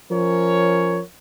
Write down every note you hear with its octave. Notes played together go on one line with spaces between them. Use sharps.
F3 C#4 A#4 C#5